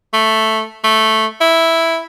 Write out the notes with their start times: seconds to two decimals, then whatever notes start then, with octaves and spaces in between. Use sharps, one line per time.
0.13 A3
0.84 A3
1.41 E4